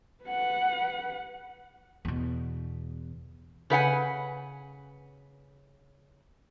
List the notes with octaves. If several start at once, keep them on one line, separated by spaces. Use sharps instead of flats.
B4 F#5
E2 B2
C#3 B4 F#5 G#5